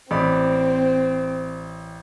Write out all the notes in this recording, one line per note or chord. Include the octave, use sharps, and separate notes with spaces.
A1 C4 D5 B5